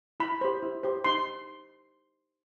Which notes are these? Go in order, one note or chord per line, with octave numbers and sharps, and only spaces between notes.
E4 B5
G4 C5
E4
G4 C5
D#4 C6